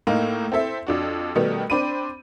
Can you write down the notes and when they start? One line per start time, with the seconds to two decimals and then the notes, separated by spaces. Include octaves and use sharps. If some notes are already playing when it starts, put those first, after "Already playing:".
0.07 A2 A#3 D#4
0.52 C4 E4 A4 E5
0.87 F2 D4 F#4
1.35 B2 D#3 G3 A3 B3
1.70 C4 D4 B5 D#7